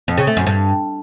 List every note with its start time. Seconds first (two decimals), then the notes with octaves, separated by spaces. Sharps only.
0.08 F2
0.18 C#3
0.27 A3
0.37 F#2
0.46 G2